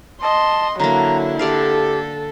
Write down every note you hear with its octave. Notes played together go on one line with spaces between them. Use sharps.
D#5 A5 C6
D3 F#3 A#3 E4 A#5
D3 G4 A4 D5 F5